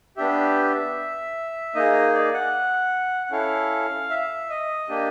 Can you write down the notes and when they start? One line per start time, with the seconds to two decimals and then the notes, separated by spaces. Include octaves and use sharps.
0.17 B3 D4 G4 E5
1.75 A#3 D#4 G#4 D#5
2.14 D5
2.34 F#5
3.26 F#5
3.31 C#4 E4 A4 F5
4.10 E5
4.50 D#5
4.89 A#3 D4 G4